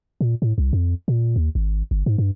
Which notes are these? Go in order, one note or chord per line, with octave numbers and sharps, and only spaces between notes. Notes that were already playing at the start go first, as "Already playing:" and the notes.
A#2
A2
C2
F2
A#2
D#2
G#1
G1
G#2
G2